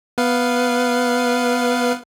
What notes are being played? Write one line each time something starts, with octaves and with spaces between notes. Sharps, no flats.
B3 B4 F5